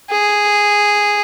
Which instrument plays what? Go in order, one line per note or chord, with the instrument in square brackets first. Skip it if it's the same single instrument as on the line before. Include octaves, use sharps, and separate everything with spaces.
[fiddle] G#4